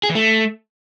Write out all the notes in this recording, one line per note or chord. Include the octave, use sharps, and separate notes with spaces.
G#4
E3
A3